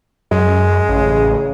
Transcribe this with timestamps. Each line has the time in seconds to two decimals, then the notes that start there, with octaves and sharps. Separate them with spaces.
0.31 F#2 G#3
0.89 A1 C#3